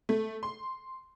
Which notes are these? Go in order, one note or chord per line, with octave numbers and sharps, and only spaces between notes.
A3
C6